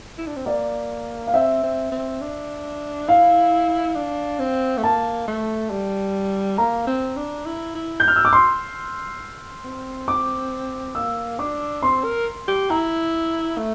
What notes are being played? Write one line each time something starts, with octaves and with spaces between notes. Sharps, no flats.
E4
D4
C4
A#3 D5
F5
C4 E5
C4
C4
D4
E4 F5
D4
C4
A3
A#3 A5
A3
G3
A#3 A#5
C4
D4
E4
E4
G6
F6
E6
D6
C6
C4
D6
A#3 E6
D4 D6
C4 C6
A#4
G4
E4 A#5
A3